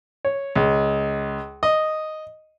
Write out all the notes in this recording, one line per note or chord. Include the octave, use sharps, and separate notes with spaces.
C#5
C#2
D#5